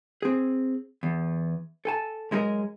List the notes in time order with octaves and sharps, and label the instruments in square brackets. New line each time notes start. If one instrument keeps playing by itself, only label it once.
[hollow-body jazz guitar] C4 G#4
E2
A4 G#5 A5
F#2 G#3 D#4 A4 A#4 D#5